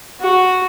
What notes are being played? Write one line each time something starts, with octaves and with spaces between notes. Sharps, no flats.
F#4